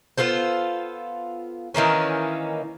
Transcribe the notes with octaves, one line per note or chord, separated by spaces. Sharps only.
B3 F4 A4 C5
D#3 E3 A#3 C#4